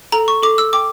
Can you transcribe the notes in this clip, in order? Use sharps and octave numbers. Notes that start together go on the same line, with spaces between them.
A4 A#5
C#6
A4 D6
E6
G5 D6